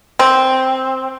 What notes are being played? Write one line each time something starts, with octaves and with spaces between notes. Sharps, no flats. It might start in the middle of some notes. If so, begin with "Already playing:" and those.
C4